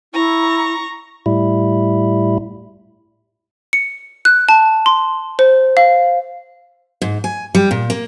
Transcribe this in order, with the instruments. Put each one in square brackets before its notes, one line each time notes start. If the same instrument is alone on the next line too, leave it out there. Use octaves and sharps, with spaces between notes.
[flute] E4 [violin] A#5 C#6
[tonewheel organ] A2 G3 E4
[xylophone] C#7
F#6
A5
C6
C5
F5
[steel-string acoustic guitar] G#2
G#5
G3
A#2
A#3